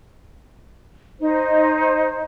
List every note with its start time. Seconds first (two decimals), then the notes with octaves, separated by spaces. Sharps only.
1.20 D#4 C5